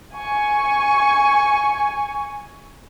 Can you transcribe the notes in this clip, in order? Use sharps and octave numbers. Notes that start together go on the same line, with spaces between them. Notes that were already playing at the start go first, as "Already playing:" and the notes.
G#5 C#6